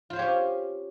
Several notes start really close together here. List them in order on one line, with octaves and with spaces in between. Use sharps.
F4 C5 C#5 G4 C#4